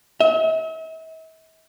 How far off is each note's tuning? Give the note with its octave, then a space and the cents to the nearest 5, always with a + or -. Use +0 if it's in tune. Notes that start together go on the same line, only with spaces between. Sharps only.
E5 -45